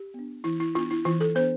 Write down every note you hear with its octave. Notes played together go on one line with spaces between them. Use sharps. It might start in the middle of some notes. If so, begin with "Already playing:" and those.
Already playing: G4
B3 D4
E3 E4
E4
B3 D4 F4
E4
E3 F4
A4
B3 D4 C5